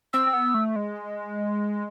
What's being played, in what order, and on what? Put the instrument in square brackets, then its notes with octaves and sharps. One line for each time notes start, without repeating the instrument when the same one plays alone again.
[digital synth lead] C4 [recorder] E6
[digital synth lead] C4
B3
A3
G#3